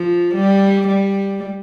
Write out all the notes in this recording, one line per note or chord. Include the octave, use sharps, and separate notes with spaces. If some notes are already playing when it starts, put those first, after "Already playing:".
Already playing: F3
G3
G3